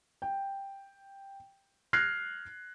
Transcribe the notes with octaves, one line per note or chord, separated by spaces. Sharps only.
G5
F6 F#6 G#6 A#6 C7